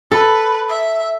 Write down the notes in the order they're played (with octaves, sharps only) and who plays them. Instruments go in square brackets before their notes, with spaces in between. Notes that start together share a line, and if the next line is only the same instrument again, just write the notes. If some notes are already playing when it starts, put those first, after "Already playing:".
[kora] A4 [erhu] B4
[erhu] E5